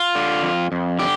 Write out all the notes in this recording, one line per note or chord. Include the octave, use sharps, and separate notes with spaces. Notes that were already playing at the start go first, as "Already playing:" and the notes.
Already playing: F4
D3
F2
F2
D3 G4